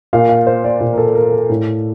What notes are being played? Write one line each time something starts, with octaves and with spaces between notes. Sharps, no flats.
A#2 F5
F5
C5
D5
A#2
A#4
A4
A#4
A4
A2